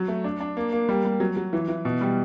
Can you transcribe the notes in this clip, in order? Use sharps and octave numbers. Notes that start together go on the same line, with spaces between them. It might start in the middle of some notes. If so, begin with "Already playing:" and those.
Already playing: F#3
A3
D4
D4
A#3
A#3
G3
G3
F#3
F#3
E3
E3
B2
G3